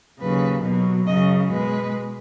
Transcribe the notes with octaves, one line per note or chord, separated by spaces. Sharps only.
D#2 C#3 F#3 B4
B2 F#3
F#2 C#3 F#3 D#5
B2 G#3 B4